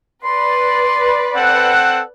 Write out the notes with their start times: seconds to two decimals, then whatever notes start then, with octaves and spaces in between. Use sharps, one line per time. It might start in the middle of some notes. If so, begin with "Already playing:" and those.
0.24 B4 D5 C6
1.35 C4 A4 F#5 F#6